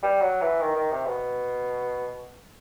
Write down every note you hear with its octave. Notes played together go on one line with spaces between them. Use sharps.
G3
F#3
E3
D#3
D#3
C3
B2